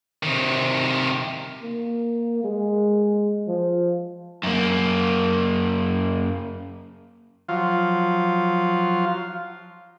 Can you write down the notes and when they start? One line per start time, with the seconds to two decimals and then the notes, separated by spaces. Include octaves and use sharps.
0.23 C3 D#3
1.63 A#3
2.44 G#3
3.48 F3
4.43 F#2 A#3
7.49 F3 F#3 F4